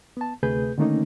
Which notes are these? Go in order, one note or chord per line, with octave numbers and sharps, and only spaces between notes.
B3 A5
D2 C3 A3 G#4 B4 G6
D3 D#3 A3 A#3 C#4 D#4